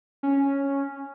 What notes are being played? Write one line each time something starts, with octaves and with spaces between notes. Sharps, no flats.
C#4